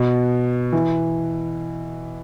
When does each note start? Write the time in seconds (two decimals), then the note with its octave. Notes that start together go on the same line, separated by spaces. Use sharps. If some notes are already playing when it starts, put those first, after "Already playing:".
Already playing: B2
0.73 E3